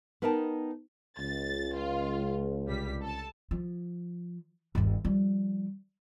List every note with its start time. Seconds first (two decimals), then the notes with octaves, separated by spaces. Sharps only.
0.22 B3 D#4 A#4 D#5 G5 A5
1.18 C#2 A6
1.76 F4
2.66 C2 G3 B6
3.01 A4 A5
3.51 F3
4.75 G1 D#2
5.05 F3 G3